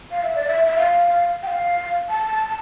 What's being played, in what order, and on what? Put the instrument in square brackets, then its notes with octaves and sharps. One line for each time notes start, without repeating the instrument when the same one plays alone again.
[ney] F5
E5
D5
E5
E5
F5
G5
F5
A5